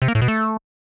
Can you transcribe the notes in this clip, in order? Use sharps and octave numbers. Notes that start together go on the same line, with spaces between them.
C3
A#3
A2
B2
A3